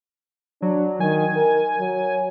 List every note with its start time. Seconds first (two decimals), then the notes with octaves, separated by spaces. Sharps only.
0.62 F#3 D4
1.00 D#3 G#5
1.36 A#4
1.79 F#3